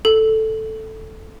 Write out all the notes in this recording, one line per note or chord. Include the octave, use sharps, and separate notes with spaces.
A4